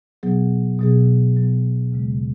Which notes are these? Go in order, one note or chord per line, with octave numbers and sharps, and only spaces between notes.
B2 F#3 B3 G#4
B2 F#3 B3 G#4
B2 F#3 B3 G#4
D#2 C#3 G#3